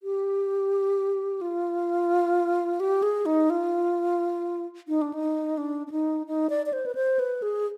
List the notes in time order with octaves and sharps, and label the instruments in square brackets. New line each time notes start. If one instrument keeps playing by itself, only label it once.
[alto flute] G4
F4
G4
G#4
D#4
F4
D#4
D4
D#4
D4
D4
D#4
D#4
D5
D5
C5
B4
C5
B4
G#4